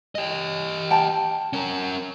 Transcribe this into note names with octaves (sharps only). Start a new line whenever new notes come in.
G4 D#5
G5 A5
C#4 A#4